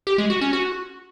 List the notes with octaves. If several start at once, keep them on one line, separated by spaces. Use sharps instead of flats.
G4
G#3
F#4
C#4
F#4